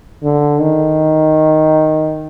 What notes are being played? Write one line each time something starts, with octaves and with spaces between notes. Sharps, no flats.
D3
D#3